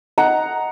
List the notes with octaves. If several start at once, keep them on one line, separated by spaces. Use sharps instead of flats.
D#4 F#5 A#5